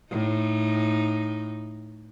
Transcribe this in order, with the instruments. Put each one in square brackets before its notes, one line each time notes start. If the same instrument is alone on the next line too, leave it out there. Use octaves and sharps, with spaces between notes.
[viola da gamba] A2 D#4